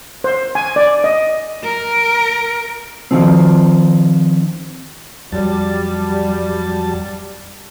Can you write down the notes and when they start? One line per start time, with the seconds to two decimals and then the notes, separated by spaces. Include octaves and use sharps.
0.24 C5
0.55 G#5
0.76 D5
1.04 D#5
1.64 A#4
3.11 D#3 F3 C4
5.32 F2 F#3 G3 A5